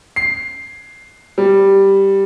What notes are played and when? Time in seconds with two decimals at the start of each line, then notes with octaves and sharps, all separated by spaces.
0.16 C7
1.38 G3